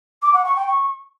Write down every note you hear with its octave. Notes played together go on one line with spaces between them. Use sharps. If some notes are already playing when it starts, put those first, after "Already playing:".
D6
F#5
C#6
G5
C#6